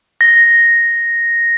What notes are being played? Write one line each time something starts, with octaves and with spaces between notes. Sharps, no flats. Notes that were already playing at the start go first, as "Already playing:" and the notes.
A#6